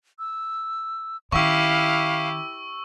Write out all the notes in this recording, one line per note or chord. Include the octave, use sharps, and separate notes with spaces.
E6
D#3 C#4 E4 G4 F5 C#6 E6